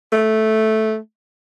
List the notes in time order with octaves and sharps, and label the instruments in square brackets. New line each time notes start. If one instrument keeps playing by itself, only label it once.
[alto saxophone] A3